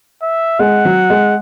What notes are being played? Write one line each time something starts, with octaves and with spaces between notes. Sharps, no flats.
E5
G#3 F#5
F#3
G#3